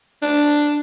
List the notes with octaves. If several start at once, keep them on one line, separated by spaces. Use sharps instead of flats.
D4